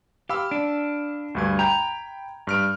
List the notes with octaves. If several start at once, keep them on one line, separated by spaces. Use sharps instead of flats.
G4 F5 B5 E6
D4
D2 G2 G#6
G5 A#5 B5 G6
G2 F6 D7